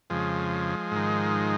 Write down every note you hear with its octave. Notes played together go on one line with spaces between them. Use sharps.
F2 C#3 F3 G#3
G#2 D#3